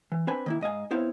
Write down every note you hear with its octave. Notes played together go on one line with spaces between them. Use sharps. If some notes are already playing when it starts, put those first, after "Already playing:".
E3
C4 D4 B4 G#5
D#3 A#3 E4
G#2 D#5 F5 G#5
B3 C4 E4 C5 C#5 F5